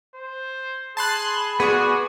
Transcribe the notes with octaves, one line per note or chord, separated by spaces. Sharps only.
C5
G#4 A5 B5 C6 F#6
B3 F#4 G#4 D5